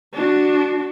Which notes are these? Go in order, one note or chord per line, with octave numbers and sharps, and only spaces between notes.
D4 F#4